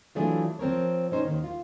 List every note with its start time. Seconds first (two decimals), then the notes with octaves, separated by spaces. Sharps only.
0.15 E3 F#3 A3 D4 F4 G#4
0.59 F3 C4 A#4 C#5
1.11 C#4 D#4 C5 C#5
1.23 D#2 D#3
1.44 F4